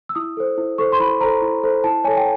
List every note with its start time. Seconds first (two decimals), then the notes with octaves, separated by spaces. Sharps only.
0.09 E6
0.15 E4 D#6
0.37 A4 C5
0.58 E4
0.78 A4 C5 C#6
0.92 C6
1.00 E4 B5
1.21 A4 C5 A#5
1.42 E4
1.63 A4 C5
1.84 E4 A5
2.04 A4 C#5 G#5
2.17 G5